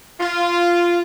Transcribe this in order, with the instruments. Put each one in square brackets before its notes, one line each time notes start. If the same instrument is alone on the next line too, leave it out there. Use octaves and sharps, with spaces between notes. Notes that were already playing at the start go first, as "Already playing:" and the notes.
[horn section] F4